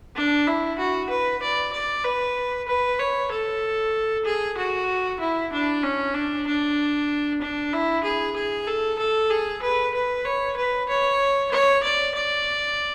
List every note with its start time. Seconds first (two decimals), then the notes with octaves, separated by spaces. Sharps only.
0.16 D4
0.47 E4
0.78 F#4
1.10 B4
1.42 D5
1.73 D5
2.05 B4
2.68 B4
2.99 C#5
3.31 A4
4.25 G#4
4.57 F#4
5.20 E4
5.52 D4
5.83 C#4
6.14 D4
6.47 D4
7.41 D4
7.73 E4
8.03 G#4
8.36 G#4
8.67 A4
8.99 A4
9.30 G#4
9.62 B4
9.94 B4
10.25 C#5
10.56 B4
10.89 C#5
11.51 C#5
11.83 D5
12.15 D5